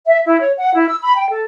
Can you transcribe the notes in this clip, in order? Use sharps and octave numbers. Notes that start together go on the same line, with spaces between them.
E5
E4
C#5
F#5
E4
E6
B5
G5
A4